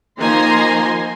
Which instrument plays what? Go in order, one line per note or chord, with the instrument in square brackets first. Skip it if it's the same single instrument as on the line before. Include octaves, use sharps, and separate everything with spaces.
[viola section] D#3 F3 A#3 G#5 A#5 C6